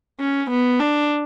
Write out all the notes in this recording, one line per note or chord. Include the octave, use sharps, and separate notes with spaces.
C#4
B3
D4